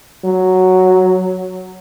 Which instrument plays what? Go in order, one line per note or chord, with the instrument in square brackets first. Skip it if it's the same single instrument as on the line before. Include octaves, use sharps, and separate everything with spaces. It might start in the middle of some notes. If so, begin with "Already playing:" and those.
[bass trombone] F#3